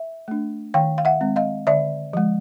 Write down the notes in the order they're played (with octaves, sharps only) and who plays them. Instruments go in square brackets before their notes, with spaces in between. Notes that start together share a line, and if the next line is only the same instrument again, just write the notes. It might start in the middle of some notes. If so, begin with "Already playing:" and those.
Already playing: [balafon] E5
A3 D4
D#3 F5 G5
F5
E5 F#5
G#3 C4
D#5 F5
D3 D5 E5
F3 G#3